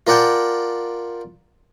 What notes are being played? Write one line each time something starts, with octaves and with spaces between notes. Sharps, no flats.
F4 A#4 D5 F#5 G5 A5